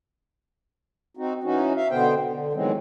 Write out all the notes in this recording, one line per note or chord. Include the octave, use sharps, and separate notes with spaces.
C4 D#4 F#4
E3 C#4 D#4 F#4
E5 F5
B2 D3 B3 C5 G5
D3
B2 D#3 E3 F#3 G#3 C4